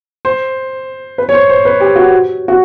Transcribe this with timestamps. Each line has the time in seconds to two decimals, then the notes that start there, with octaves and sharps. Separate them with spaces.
0.25 C5
1.18 B4
1.29 C#5
1.34 C5
1.49 C5
1.65 B4
1.80 G4
1.96 F#4
2.48 F#4